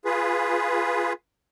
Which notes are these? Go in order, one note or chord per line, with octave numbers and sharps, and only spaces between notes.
F4 G#4 B4